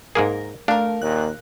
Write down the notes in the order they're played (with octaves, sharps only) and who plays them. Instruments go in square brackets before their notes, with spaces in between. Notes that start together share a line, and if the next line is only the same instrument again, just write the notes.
[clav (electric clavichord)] G#2 A#3 G#4 [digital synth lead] A#4
[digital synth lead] A3 [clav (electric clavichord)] D4 [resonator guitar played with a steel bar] A#4 F5
[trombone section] D#2 A#2 [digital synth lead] F#6